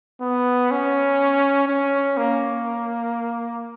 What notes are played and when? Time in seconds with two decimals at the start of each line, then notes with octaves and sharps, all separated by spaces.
0.21 B3
0.71 C#4
1.68 C#4
2.18 A#3